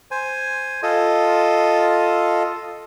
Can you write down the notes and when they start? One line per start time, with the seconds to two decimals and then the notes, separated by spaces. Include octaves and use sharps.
0.11 C5 G#5
0.83 F4 A4 D#5